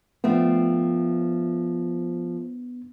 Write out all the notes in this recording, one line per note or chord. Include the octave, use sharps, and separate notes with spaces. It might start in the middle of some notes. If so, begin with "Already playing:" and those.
F3 A3 B3 C4 D4